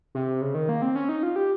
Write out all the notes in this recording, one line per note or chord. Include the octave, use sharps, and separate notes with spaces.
C3
C#3
D#3
A#3
C4
C#4
D#4
F4
G4